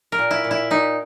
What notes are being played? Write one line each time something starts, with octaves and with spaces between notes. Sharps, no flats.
A#4
A#2
E4
A#2
E4
A#2 D#4